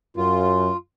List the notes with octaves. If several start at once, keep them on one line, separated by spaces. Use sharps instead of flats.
F#2 F4